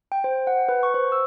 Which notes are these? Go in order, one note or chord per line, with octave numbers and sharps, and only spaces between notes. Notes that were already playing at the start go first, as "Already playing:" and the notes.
G5
C5
F#5
B4
C#6
C5
E6